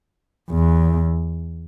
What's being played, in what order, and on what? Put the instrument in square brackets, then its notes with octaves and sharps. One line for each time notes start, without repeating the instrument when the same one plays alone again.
[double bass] E2